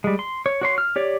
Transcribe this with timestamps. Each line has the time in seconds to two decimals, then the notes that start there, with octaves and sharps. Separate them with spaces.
0.04 G3 G#3
0.19 C6
0.46 C#5
0.61 F#4 C#5 C6
0.78 F6
0.96 G4 C#5 D5